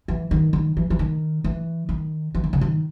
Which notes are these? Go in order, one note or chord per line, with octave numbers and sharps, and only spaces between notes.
E3
D#3
D#3
E3
E3
D#3
E3
D#3
E3
D#3
C#3
D#3